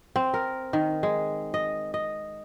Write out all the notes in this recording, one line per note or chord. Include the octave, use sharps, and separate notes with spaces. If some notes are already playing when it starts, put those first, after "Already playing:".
C4
A#4
D#3
G#3
D#5
D#5